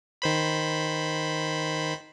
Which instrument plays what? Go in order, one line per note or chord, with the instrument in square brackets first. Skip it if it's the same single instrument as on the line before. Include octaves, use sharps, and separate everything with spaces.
[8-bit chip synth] D#3 C5 B5